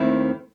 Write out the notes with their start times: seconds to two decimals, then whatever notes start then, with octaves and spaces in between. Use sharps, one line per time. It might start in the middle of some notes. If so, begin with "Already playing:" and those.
Already playing: D#2 D#3 A3 C4 E4